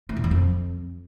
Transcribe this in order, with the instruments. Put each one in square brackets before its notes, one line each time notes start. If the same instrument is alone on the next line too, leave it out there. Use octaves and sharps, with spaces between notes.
[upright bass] A3
A#2
E2
F2